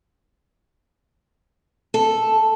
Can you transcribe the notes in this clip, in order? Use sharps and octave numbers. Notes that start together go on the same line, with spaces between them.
A4